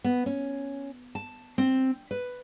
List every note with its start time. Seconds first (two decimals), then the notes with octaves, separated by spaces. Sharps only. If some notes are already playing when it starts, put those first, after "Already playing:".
0.04 B3
0.26 C#4
1.15 A5
1.58 C4
2.11 B4